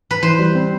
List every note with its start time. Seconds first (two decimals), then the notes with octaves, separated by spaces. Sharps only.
0.11 B4
0.23 E3 C5
0.39 G3
0.55 C4